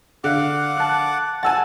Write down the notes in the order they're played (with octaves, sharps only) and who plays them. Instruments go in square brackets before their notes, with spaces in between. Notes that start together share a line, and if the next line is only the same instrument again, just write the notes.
[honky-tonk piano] D3 F5 [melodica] F#5 D6
[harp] A5 F#6
[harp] F#5 A5 [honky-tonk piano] G#5 E6 A6